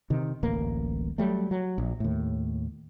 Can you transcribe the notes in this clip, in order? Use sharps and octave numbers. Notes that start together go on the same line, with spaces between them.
C3 D#3
D1 A1 A#3
F#3 G3 A3
F#3
A#1
D#2 A2